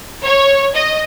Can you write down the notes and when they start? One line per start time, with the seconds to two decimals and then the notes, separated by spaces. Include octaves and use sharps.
0.24 C#5
0.74 D#5